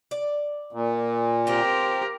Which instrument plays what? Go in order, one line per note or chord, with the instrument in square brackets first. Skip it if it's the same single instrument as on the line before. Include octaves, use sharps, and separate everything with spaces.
[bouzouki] D5
[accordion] A#2
[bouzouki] C4 F4 [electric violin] G4 A#4